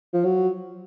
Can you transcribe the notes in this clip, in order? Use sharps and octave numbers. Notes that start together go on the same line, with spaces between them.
F3
F#3